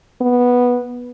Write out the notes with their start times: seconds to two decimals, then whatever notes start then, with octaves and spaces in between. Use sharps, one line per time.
0.21 B3